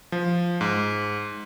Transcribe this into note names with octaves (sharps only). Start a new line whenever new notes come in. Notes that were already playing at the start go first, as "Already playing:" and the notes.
F3
G#2